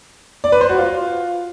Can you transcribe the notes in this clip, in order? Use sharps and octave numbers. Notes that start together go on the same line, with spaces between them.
D5
B4
C5
F#4
F4